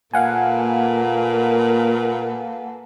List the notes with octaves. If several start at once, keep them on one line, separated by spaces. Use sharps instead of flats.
A#2 A#3 A4 B4 F5 F#5 G#5